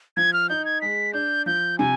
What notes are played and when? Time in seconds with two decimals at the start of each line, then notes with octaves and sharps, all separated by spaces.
0.17 F3 G#6
0.33 F6
0.50 D#4 G6
0.65 G#6
0.81 G#3 B6
1.13 D4 G6
1.46 F3 G6
1.79 C3 G#5